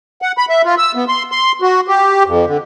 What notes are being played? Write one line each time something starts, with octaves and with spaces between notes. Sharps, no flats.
F#5
B5
E5
F4
E6
B3
C6
C6
F#4
G4
F2
D3